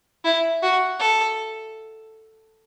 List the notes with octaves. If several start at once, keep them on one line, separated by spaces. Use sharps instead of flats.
E4
F#4
A4